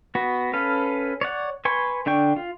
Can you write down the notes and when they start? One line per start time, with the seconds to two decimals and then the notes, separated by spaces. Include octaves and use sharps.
0.15 B3 F#4
0.54 C#4 A4 B4 F5
1.21 C#5 D5 F#5
1.65 B4 G#5 C6 C#6
2.06 D3 D4 G5 C#6
2.36 F4